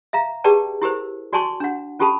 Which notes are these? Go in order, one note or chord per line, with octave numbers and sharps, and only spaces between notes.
E5 F5 A#5
G4 G#4 B4 D5 G5 A5
E4 G4 A#4 C5
F#4 D5 G#5 A5 C6 C#6
D4 F#5
C#4 F4 G4 A4 A5 B5